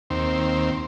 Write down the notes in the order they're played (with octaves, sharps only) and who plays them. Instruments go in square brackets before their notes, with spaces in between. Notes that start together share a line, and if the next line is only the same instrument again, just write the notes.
[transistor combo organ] D#2 C4